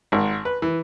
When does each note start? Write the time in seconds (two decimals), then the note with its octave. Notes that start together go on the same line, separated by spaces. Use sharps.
0.12 G#1
0.45 B4
0.62 E3